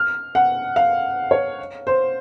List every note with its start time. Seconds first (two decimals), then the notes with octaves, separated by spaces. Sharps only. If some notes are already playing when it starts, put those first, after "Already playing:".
Already playing: F6
0.35 F#5
0.76 F5
1.31 C#5
1.87 C5